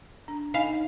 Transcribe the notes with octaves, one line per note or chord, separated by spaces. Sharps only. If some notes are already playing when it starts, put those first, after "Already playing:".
D4
D#4 D#5 F5 G#5